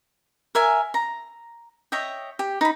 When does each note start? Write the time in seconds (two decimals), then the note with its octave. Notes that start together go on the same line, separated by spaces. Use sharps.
0.55 A#4 E5 G#5
0.94 A#5
1.92 C#5 D#5 E5 G5
2.39 G4
2.61 D#4 B5